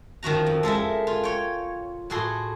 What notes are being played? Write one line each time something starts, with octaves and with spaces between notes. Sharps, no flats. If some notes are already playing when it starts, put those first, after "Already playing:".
D#3 F3 F#4 A#5
F2
G#3 A4 A#4 E5
F4 G#5
C#5 G5
A2 F#4 G#4 A4 C6